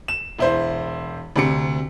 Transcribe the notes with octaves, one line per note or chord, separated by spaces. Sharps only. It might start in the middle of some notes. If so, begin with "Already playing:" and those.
E7
E1 E4 C5
D2 C3 C#7